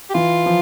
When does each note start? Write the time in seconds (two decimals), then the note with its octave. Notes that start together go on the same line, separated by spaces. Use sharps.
0.10 G4
0.14 E3 F4
0.46 F3